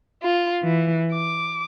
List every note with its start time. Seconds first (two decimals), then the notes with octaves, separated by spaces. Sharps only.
0.22 F4
0.63 E3
1.12 D6